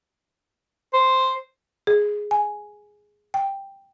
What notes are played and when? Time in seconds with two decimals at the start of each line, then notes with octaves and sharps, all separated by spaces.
0.93 C5
1.87 G#4
2.31 G#5
3.34 G5